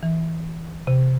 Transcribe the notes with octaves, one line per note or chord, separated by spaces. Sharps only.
E3
C3